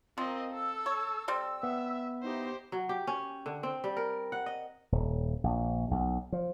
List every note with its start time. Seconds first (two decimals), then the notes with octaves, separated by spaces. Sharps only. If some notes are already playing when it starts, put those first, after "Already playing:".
0.18 F3 C4 A#4 D#5
0.52 A4 E6
0.86 C#5
1.28 G3 C4 E6
1.63 B3 E5
2.23 D#4 E4 G4 C5 C6
2.72 F#3
2.89 G4
3.07 C#4
3.46 D3
3.63 C4
3.84 G3
3.97 A#4
4.32 F#5
4.46 D#5
4.92 D#1
5.44 A#1
5.91 B1
6.32 F3